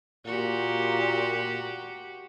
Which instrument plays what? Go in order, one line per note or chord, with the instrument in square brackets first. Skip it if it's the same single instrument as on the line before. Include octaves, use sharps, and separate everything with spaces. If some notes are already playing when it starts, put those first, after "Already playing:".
[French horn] A#2 [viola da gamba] F#4 G4